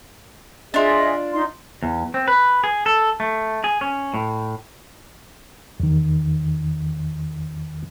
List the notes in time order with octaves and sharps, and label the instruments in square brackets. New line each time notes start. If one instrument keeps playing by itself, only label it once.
[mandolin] D4 F4 [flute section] G#4 D#5 E5
[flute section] D#4 C6
[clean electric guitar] E2
C4
B4
G#4
A4
A3
G#4
C#4
A2
[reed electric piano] E2 D#3